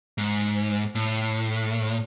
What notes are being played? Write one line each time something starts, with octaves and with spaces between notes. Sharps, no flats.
G#2
A2